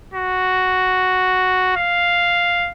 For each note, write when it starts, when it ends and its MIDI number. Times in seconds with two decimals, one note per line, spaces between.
0.14 1.72 66
1.77 2.71 77